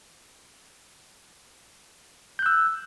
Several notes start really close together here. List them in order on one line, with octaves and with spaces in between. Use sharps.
G6 F#6 E6